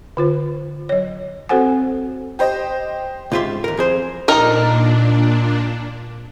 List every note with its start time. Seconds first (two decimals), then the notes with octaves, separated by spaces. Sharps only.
0.17 D3 F4 C5
0.89 F#3 C#5
1.49 C4 F#4 A4 C5 F#5 G#5
2.39 G4 C5 D#5
3.32 C#2 G#2 F4 G4 E5 C6
3.64 D#2 A#4
3.77 F2 G#4 C5
4.28 A#2 D4 D#4 A#4